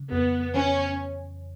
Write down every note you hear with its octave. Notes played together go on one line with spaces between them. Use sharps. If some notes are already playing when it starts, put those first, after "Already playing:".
Already playing: C#3
F2 B3
E3 C#4